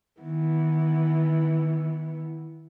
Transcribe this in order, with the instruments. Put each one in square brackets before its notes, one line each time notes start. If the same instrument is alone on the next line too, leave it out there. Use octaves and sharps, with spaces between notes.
[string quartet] D#3 E3 B3